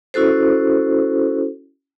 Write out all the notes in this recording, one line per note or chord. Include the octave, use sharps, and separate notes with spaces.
C#4 E4 F#4 A4 C5